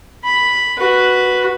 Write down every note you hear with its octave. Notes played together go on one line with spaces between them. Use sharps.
B5
F#4 B4